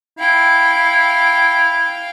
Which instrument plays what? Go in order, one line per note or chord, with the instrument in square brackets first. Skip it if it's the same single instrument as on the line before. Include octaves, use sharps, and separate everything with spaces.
[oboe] E4 [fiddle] F5 G5